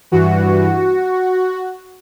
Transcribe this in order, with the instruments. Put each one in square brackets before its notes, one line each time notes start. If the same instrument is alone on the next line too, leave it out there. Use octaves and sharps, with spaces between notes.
[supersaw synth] G2 E3 F#4